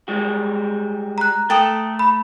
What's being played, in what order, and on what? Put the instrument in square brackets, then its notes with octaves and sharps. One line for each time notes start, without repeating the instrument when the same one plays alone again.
[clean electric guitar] G3 G#3 F#4
[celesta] A#5 F#6
[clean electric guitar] A3 [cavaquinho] A4 G5 D#6
[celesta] B5